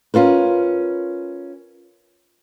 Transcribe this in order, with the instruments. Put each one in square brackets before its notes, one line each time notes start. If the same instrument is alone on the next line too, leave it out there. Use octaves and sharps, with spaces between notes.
[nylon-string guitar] C#4 F4 A#4 B4